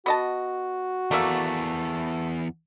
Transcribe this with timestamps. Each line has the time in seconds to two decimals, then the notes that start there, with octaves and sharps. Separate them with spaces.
0.06 B3 F#4 D#5 A5
1.11 E2 A3 A#3 D5 E5